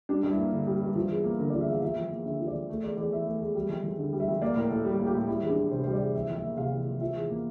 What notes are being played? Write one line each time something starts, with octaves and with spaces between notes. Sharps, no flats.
G3 D4
G2
E4
A#3
D3
G3
G2
F3
E2
A#3
D3 A#4
F3 D5
E5
E2 F5
F3 E5
F2
A#3
D3 E5
F3
D5
F2
A3
E2 D5
E2 D5
E3 E5
A3
E2
G3
F2
F2
D3
G3
E5
F2
A#3 D5
A2 A#4
A2 A4
G3
A#3
G4
A2
G3 E4
E2
D4
E2
C3 C5
G3 C5
D5
E2
E3 E5
F2
E5
A#3
C3 F5
E3
F2
F3 E5
E2
A#3